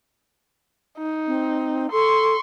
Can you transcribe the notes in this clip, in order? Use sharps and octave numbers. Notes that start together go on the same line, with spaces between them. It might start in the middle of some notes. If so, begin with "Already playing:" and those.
D#4
C4
A4 C6 C#6